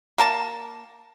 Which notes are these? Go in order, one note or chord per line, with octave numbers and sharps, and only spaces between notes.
A#3 A#4 A5